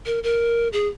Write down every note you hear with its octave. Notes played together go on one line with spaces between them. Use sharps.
A#4
A#4
G#4